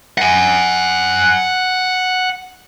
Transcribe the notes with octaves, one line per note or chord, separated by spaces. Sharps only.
F#5 G#5